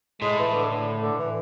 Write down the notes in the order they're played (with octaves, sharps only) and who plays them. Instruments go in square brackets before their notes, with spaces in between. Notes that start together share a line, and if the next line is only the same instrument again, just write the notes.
[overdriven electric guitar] A2 [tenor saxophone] G#3
[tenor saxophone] E3
D3
D3
D3
E3